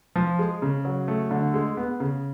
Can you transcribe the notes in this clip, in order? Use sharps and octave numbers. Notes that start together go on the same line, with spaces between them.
F3
G#3
C#3
F#3
A3
D3
G#3
B3
C#3